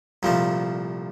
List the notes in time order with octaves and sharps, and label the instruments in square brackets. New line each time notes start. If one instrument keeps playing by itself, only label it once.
[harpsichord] C2 A#2 F3 A3